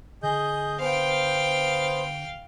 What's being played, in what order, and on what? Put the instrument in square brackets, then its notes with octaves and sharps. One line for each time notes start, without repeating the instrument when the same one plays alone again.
[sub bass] D3 [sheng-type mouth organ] G#4 D#5 G6
[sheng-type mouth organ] B3 C5 [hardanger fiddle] F5 G5